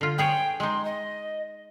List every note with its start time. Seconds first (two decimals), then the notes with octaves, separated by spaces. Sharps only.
0.01 D3 F4
0.18 B3 G#4 C#5 G5
0.60 G#3 D#4 C6
0.85 D#5